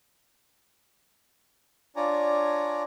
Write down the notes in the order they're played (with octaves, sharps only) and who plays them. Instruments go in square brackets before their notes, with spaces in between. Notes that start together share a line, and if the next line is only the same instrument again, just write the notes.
[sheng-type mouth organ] D4 F4 C#5 D5 G#5 A#5